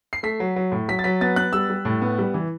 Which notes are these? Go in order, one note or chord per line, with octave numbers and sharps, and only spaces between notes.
C7
A3 B6
F#3
F#3
A2
F#3 B6
A6
F#3 B6
B3 A6
B3 F#6
G3 E6
G3
A2
B3
G3
E3